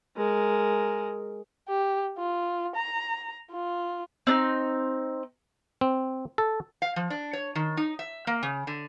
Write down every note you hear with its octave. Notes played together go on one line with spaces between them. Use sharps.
G#3 A#4
G4
F4
A#5
F4
C4 D4 D#4
C4
A4
F5
F3
D4
C#5
D#3
D#4
E5
A#3
C#3
D3